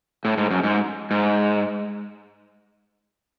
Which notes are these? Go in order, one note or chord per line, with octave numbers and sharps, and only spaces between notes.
A2
G#2
F#2
G#2
G#2